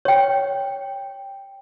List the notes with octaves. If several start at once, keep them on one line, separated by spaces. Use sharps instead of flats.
C#5 G5